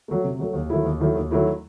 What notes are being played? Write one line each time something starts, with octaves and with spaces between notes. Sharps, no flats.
F#3 A3
C3
F#3 A3
D#2
D#3 F#3 A3 E4
D#2
D#3 F#3 A3 E4
D#2
D#3 F#3 A3 E4